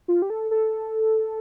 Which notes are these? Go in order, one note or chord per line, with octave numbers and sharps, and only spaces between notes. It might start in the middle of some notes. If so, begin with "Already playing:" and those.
F4
G4
A4
A4